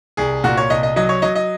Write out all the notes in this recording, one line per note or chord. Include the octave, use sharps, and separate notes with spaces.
C2 G#4
A#2 F#4
C#5
C2 D#5
D#5
F#3 D#5
C#5
F#3 D#5
D#5